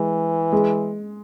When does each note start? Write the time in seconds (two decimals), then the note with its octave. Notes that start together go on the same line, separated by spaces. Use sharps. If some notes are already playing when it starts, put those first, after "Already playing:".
Already playing: E3 G#3
0.53 G#3